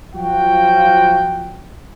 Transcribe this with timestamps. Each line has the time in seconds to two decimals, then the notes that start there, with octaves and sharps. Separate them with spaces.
0.14 F3 F#3 F4 F#4 F#5 G5